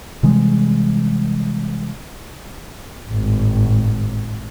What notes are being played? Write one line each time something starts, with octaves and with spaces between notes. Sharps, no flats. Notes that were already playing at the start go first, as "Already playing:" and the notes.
C3 E3 G3 G#3
G#1 A2